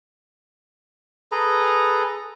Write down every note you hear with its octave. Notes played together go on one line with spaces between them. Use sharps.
G#4 A4 B4 A#5